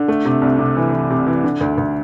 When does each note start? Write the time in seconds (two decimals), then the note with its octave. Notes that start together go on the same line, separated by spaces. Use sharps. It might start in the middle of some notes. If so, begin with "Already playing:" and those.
Already playing: D3
0.08 A3
0.25 C3
0.42 C2
0.59 C3
0.76 E3
0.93 E3
1.10 C3
1.27 E3
1.44 D3
1.61 D2
1.78 D2